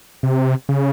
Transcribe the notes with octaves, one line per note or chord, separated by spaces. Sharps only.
C3
C#3